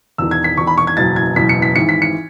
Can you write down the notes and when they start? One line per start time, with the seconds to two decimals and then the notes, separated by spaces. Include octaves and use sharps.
0.18 E1 E2 D#3 E6
0.31 G#6
0.44 B6
0.57 E1 E2 D#3 C#6
0.67 B5
0.78 C#6
0.87 G#6
0.97 F#1 E2 B2 F#3 A6
1.16 G#6
1.36 F#1 E2 B2 F#3 B6
1.49 C#7
1.62 B6
1.76 G#1 G#2 E3 C#7
1.89 B6
2.02 C#7